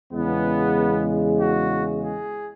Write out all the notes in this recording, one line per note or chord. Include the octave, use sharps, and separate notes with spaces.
E2 C#3 G#3 B3
F#4
G#4